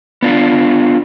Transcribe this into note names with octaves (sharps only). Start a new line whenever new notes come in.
B3 D4 F4